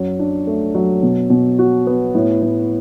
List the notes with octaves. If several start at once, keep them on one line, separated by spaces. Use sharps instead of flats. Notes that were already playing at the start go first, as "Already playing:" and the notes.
Already playing: F#2 F#3
D4
A3
F#3
B2
B2
F#4
B3
A2
A2